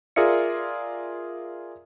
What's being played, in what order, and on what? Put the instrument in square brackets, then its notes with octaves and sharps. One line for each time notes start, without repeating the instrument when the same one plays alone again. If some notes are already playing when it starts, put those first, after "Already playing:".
[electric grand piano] F4 G#4 A#4 D5 E5 C#7